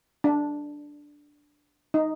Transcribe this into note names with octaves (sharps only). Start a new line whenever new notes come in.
D4
D#4